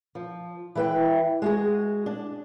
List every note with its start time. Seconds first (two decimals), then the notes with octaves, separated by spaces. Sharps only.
0.15 F3
0.75 E3 E4 B4 E5 G5
1.42 G#3 F#4 G#4
2.06 D4